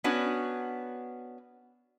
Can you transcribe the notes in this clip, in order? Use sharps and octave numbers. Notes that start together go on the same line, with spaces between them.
B3 C#4 D4 F#4